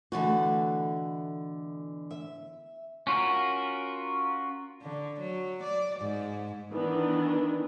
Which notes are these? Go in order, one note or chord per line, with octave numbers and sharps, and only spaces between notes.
B2 D3 E3 A3 F#4
E5
C#4 F4 F#4 A#4
D3
F#3
D5
G#2
D#3 E3 B3 D4